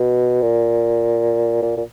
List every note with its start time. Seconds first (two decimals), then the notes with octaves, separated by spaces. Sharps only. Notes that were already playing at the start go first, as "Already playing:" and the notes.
Already playing: B2
0.42 A#2
1.62 A#2
1.77 A#2